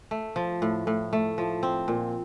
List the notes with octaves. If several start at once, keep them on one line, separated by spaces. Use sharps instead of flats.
A3
F3
A2
A2
A3
F3
C4
A#2